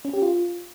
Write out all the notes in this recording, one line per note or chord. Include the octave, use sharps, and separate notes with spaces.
C#4
G4
F4